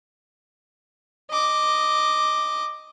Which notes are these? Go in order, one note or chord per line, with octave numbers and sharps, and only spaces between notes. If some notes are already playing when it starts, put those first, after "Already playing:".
D#5 D6